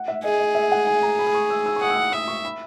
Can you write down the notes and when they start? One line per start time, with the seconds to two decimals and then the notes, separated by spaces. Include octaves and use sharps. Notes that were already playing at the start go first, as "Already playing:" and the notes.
Already playing: F#5
0.08 E5
0.24 G#4 D#5
0.39 D#5
0.55 E5
0.72 F#5
0.87 G#5
1.03 A#5
1.19 B5
1.27 D#6
1.35 C#6
1.50 E6
1.66 E6
1.76 C#6
1.81 F#5 D#6
1.89 E6
1.96 D#6
2.12 E5 D#6
2.28 C#6
2.45 B5